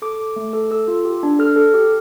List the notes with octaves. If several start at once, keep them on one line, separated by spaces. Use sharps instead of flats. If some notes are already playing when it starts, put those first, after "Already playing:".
A4 D6
A4
A3
A4
A4 E6
F4
G4
D4
A4 F6
A4
G4